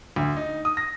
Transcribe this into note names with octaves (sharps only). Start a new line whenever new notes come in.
D2
D#4
D#6
A#6